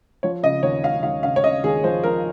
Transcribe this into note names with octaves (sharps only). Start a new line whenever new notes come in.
F3 C#5
C#3 D#5
D#2 C#5
C#3 F5
D#2 F5
C#3 F5
C#5
C#3 D#5
D#2 G#4
F3 C5
F3 A#4